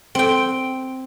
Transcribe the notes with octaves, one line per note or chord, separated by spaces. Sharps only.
C4 G5